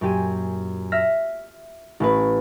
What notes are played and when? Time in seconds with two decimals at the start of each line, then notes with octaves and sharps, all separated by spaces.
0.01 F#2 A#2 G4 G#5 D#7
0.92 E5 F6 A#6 B6
2.00 A1 C#4 B4